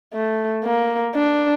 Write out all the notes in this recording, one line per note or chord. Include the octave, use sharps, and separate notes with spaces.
A3
A#3
D4